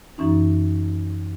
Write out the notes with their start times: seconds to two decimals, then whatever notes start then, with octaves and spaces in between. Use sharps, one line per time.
0.18 F#2 E3 C#4 D#4